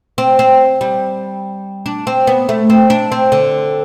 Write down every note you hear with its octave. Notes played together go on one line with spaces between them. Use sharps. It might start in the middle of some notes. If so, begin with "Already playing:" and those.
C4
C4
G3
D4
C4
B3
A3
C4
D4
C4
D3